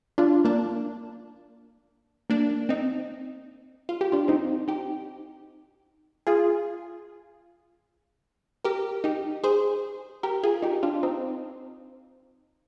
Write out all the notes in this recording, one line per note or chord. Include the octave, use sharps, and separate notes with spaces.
D4 F4
A#3 D4
A#3 D4
C4 D#4
F4
G4
D4 F4
C4 D#4
D#4 G4
F4 G#4
G4 A#4
D#4 G4
G#4 C5
G4 A#4
F4 G#4
D#4 G4
D4 F4
C4 D#4